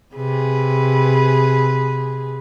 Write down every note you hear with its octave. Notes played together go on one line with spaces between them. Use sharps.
C3 G#4 B4